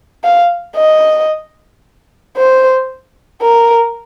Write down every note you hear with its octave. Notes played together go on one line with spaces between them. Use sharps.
F5
D#5
C5
A#4